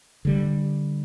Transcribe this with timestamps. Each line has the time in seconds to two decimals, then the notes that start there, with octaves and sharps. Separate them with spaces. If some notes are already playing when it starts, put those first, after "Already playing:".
0.25 D3 G3